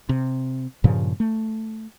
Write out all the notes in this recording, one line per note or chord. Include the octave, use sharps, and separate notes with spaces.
C3
G2 A#2 C#3 F3
A3